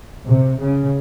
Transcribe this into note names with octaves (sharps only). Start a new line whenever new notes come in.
C3
C#3